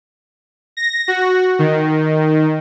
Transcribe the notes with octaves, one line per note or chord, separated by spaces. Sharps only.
A#6
F#4
D#3